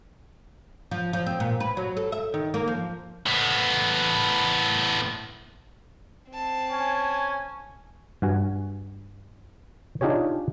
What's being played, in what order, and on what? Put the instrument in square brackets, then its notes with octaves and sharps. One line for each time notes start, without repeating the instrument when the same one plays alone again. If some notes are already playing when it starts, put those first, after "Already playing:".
[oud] F3
F3
C4
A#2
B4
F#3
A4
E5
D#3
A#3
F3
[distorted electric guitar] A2 B3
[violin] C4 A5
[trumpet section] C#4 G#5
[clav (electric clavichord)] G2 F#4 G#5
D4 D#4 F4 G4 G#4 C#5